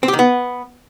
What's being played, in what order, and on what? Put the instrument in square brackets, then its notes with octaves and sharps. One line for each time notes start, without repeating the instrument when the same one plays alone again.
[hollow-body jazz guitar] C4
G4
D#3
B3